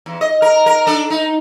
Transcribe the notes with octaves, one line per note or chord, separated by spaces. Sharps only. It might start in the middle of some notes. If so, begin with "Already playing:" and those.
E2
D#5
A#4
A#4
D4 A4
D#4